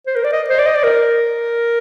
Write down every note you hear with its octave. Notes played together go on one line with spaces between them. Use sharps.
C5
A#4
D5
D#5
C5
D5
D#5
D5
A#4